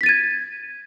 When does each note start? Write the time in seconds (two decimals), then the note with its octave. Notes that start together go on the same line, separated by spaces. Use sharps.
0.01 B6
0.03 A6
0.06 D#7
0.09 G#6